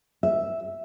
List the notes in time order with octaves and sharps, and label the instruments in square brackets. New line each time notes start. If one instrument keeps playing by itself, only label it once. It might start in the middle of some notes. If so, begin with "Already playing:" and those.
[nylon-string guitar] E5